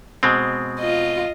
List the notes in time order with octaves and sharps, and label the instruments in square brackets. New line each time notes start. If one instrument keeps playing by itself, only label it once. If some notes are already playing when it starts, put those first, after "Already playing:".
[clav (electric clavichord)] B2 G#3 C4
[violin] F4 D#5